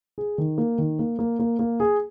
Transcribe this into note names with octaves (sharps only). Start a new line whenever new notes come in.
G#4
D#3
A#3
D#3
A#3
A#3
A#3
A#3
G#4